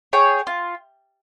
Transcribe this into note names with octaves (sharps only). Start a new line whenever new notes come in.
G#4 C#5 G5
F4